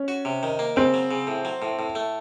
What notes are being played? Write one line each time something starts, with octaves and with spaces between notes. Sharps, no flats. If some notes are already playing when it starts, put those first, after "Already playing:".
Already playing: C#4
F#4
C3
D#3
A#3
C#3 C4
F#3
C#3
A2
F#3
A2
A2
A3